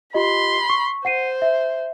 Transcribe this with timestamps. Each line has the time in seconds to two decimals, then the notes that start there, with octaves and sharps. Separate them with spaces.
0.14 F4 G4 D#5 B5 C6
0.70 C#6
1.05 C5 F#5 C7 D#7
1.42 E5